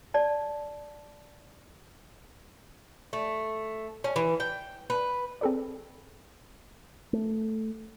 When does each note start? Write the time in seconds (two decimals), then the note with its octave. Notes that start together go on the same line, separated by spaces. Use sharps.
0.14 D5 A5
3.13 A3
4.04 C#4
4.16 E3
4.40 G5
4.90 B4
5.41 C4 G#4 A4 B4 D5
7.13 A3